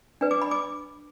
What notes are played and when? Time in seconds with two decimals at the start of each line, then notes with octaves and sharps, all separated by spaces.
0.21 D4 B4
0.31 D6
0.42 B5
0.51 D6